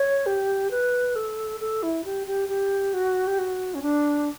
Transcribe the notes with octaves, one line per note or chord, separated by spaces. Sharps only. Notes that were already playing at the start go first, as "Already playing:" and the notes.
Already playing: C#5
G4
B4
A4
A4
E4
G4
G4
G4
F#4
G4
F#4
C#4
D4